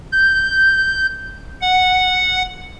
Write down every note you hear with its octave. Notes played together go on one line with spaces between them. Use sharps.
G6
F#5